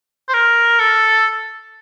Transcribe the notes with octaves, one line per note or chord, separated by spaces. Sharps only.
C5
A#4
A4